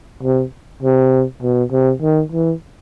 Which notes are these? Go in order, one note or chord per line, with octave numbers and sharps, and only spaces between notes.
C3
C3
B2
C3
D#3
E3